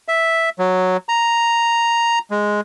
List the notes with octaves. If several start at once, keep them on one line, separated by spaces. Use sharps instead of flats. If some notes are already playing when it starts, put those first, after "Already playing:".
E5
F#3
A#5
G#3